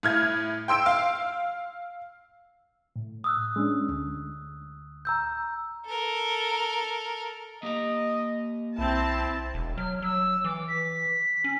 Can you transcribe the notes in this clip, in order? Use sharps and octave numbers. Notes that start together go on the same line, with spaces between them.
A2 F6 G#6
G5 C6 E6 D7
F5
A2
D#6 E6 F#6
G#3 C#4 D4
D2
A#5 E6 G6
A4 A#4
A#3 G4 D#5 A#5
B1 C4 E4 A5
E1
F#3 F6
F#3 E6
E3 D6
B6
C#4